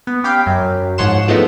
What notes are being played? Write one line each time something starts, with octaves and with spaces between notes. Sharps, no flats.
B3
C#4 G4 F5 G5 B5
F#2 F#3
G#2 F3 C#5 F#5 C6 E7
D#3 F3 G#3 A3 B3 D#4